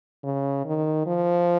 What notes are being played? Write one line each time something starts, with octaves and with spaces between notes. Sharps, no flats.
C#3
D#3
F3